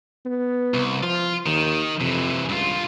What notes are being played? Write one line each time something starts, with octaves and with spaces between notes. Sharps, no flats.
B3
C2
F3 F4
D#2 D#3
F2 C3 E3
C#2 G2 F4